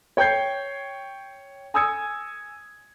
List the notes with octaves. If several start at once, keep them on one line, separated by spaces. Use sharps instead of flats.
C#5 G5 C#6 G6 G#6 C7
G#5 D#6 E6 G#6 C#7